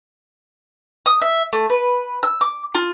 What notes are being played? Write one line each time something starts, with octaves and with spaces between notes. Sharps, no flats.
D#6
E5
A3
B4
E6
D6
F4